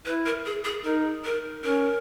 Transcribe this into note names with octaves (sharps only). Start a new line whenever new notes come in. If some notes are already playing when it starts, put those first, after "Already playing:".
E4 B4
A#4
G#4
G#4
D#4 A#4
A#4
C#4 A#4